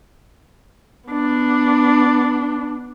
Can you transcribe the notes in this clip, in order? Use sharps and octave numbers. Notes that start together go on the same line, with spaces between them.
B3 D4